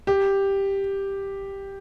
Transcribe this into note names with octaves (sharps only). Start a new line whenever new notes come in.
G4